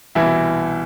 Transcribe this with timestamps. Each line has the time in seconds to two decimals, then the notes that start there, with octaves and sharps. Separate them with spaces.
0.15 C2 B2 E3 E4